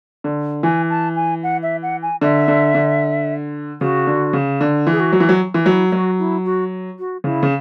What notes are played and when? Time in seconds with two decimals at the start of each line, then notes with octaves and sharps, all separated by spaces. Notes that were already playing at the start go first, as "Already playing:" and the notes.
0.24 D3
0.63 E3 G#5
0.90 A5
1.16 G#5
1.43 F#5
1.62 E5
1.82 F#5
2.02 G#5
2.21 D3 E5
2.48 D3
2.75 D3
3.81 C#3 F#4
4.07 D3
4.33 C#3
4.61 D3
4.87 E3 G#4
5.00 F#4
5.12 F#3
5.20 E3
5.29 F#3
5.54 E3
5.66 F#3 E4
5.92 F#3 F#4
6.19 E4
6.45 F#4
6.99 F#4
7.24 C#3 E4
7.43 C#3